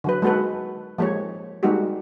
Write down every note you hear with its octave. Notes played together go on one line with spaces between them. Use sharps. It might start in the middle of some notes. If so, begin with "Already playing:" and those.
D3 F#3 B4
G#3 A#3 F#4 A4 B4
F3 G#3 A#3 G4 C#5
G3 G#3 A#3 D#4 F#4 G4